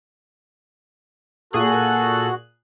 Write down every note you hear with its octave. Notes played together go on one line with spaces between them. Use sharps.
A#2 F#4 G#4 A4 F#6